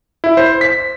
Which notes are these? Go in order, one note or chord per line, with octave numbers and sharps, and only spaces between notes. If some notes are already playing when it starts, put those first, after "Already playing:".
E4
C5
B6